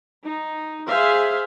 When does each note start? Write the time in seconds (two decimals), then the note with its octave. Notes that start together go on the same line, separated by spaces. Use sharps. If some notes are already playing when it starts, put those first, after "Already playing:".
0.24 D#4
0.88 G#4 C5 E5 F5